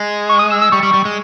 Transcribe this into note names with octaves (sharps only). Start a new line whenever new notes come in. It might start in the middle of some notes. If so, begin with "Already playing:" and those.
Already playing: G#3
C#6
D#6
E6
E6
G3 C#6
G3
G3
G#3